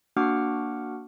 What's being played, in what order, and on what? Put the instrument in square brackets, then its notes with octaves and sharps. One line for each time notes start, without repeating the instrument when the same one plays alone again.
[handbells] A#3 D4 F#4 F#5 D6 F6